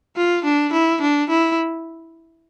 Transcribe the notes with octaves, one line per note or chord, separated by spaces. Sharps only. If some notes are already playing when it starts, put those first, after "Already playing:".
F4
D4
E4
D4
E4